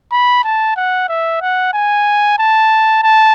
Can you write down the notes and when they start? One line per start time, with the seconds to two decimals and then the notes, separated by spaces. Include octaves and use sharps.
0.12 B5
0.44 A5
0.77 F#5
1.09 E5
1.41 F#5
1.73 G#5
2.39 A5
3.03 A5